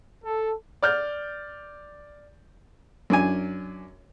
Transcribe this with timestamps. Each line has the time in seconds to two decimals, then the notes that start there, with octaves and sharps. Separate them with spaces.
0.25 A4
0.82 D5 F6 G6
3.10 F#2 D4 G#5